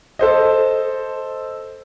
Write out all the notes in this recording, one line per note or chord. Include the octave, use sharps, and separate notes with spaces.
A4 C5 D#5